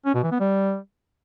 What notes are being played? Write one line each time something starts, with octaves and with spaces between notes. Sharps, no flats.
C#4
B2
E3
B3
G3